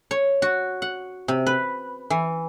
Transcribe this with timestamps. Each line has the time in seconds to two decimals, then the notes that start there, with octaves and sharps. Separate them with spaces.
0.11 C#5
0.42 F#4
0.82 F#5
1.28 C3
1.47 B4
2.10 E3